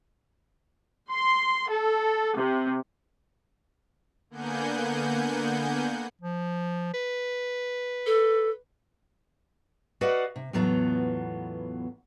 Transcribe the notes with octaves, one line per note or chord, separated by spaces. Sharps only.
C6
A4
C3
D3 A#3 B3 F#5 G#5 G6
F3
B4
A4
F#4 B4 D5 D#5 F5 F#5
C3
E2 A2 F#3 B3 F4 A#5